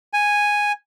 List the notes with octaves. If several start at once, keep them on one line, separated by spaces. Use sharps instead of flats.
G#5